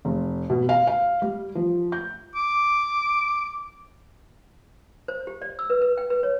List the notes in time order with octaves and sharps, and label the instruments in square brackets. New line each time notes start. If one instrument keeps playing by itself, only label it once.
[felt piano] F1
B2
F5
F5
G3
F3
G6
[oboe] D6
[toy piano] C5
G4
D5
E6
B4
B4
G5
B4
C#5